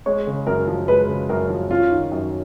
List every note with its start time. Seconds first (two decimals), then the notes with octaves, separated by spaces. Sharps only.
0.06 G#3 C#5
0.27 C#3
0.47 F#2 A#4
0.67 F3
0.88 G#3 B4
1.09 C#3
1.29 F#2 A#4
1.50 F3
1.71 C#4 F4
1.91 D#3
2.12 F#2